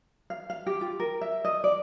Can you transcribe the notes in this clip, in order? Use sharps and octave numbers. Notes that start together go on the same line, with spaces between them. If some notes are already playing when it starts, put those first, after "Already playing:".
F5
F5
G4
F4
A#4
E5
D#5
D5